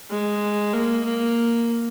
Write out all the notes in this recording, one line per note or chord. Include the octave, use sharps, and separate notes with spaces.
G#3
A#3
A#3